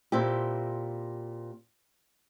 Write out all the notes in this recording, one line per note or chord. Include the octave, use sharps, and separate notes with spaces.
A#2 C4 E4 G4